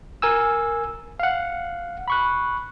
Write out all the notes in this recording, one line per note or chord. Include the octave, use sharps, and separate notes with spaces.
A#4 G#5 E6
F5 F#5
B5 C#6 F#6